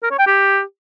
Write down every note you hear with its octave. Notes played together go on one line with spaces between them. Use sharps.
A#4
C#5
G5
G4